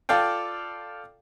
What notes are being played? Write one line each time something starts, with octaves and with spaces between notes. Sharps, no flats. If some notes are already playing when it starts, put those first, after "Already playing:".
F4 A4 D5 F5 G5